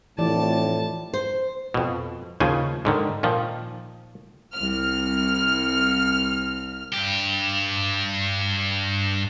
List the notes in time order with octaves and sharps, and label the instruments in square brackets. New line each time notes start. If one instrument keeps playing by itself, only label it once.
[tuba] F1 [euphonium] A2 [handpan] E3 F3 D5 [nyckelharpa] A5
[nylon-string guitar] C5
[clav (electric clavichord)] F2 B2
D#2 C#3 F3 G#5
G#2 D3 D#3
A#2 D#3 F3
[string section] C2 F6
[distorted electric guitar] G2 G4